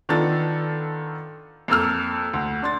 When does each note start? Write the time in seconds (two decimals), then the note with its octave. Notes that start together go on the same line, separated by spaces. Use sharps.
0.09 D#3 B3 D4 F4 A4 A6
1.68 F2 A#3 A4 E6 F6
2.34 D2
2.63 D4 C6 A6